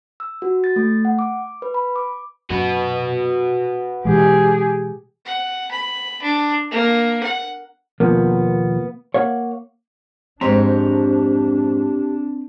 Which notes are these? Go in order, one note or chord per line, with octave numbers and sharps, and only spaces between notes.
E6
F#4
A6
A3
F#5
D6
B4
B5
D6
F#2 F#4 B4
B2 E3 G#3 G4 G#4
F#5
B5
D4
A#3
F#5
D#2 B2 F3 A#3 B3
A#3 C#5 F5 F#5
F2 G#2 C4 D4 G4 C5 C#5 A#5